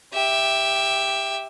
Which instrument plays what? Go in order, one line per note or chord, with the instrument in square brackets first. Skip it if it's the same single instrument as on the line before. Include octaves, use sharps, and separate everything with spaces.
[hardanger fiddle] G4 E5